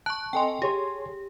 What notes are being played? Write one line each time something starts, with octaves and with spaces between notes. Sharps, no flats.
A5 C#6 F#6
C4 A4 D#5 G5 G#5 C6
G4 G#4 C#5 C6